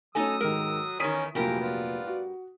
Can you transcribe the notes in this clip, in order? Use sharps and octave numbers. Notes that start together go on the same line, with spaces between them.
F#3 A3 C#4 D#4 A4 G#5 D#6 E6
G#2 D#3 A#4
E2 D#3 C#4 A#4 D#6 B6 D#7
F1 G2 A#2 E3 F#3 F4 G4 A#4
B3 F4 D5
F#4